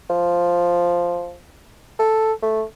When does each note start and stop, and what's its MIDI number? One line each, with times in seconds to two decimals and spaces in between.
0.10 1.35 53
1.99 2.33 69
2.42 2.63 57